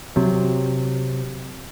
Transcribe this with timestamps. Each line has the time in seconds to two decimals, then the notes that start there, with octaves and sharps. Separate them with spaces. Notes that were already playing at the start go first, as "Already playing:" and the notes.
0.16 C3 F#3